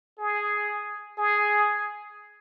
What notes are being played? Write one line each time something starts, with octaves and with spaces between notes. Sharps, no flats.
G#4
G#4